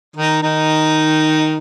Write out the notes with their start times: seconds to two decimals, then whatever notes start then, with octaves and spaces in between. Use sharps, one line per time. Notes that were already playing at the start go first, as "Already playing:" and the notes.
0.16 D#3 D#4
0.42 D#3 D#4